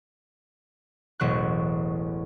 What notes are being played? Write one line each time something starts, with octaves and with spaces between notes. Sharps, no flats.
E1 A1 F#3 C#6 F#6